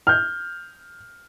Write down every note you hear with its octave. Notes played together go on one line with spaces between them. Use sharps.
F6 G6